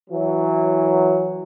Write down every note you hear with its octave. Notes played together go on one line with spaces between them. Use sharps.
E3 F#3